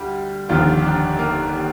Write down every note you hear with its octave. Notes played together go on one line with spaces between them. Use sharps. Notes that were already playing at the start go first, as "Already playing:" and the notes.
Already playing: D2 G3
F1 D#2 D3 F3 F4
D4
A#3